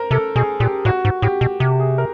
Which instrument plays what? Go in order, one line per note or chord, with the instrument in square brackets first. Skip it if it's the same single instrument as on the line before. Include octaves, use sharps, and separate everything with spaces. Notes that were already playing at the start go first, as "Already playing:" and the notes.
Already playing: [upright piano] A#4 C5
[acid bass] C3 [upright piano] A4
[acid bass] B2 [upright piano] G#4
[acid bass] A#2 [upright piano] G4
[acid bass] A2 [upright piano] F#4
[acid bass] G#2
[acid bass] A2 [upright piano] G4
[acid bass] B2
[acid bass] C3 [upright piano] G4
[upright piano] G#4
A#4